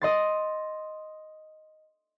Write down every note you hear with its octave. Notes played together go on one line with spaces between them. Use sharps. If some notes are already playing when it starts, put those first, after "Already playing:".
D#5 C6 A6